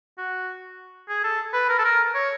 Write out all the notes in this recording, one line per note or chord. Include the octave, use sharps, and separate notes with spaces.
F#4
G#4
A4
B4
A#4
A4
A#4
C#5